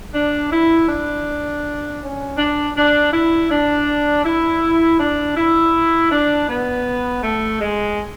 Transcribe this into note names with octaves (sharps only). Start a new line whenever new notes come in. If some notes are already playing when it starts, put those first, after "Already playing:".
D4
E4
D4
C#4
D4
D4
E4
D4
E4
D4
E4
D4
B3
A3
G#3